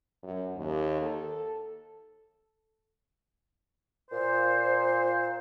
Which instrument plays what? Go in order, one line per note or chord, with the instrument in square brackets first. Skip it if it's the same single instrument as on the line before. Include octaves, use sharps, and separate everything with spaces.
[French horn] F#2
D#2
A4
[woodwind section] A#2 C5